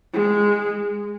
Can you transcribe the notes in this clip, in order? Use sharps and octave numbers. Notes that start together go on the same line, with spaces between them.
G#3